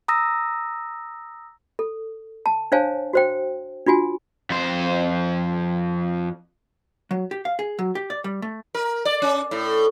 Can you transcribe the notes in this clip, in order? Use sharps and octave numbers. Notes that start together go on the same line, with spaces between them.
A#5 D#6 E6 A#6
A4
A5
D4 C5 C#5 F5 G#5 A5
F#4 C5 G5
D4 F4 F#4 G#5
F2 C5
F#3
G4
F5
G#4
F#3
G4
D5
G3
A3
A#4
D5
C#4
A2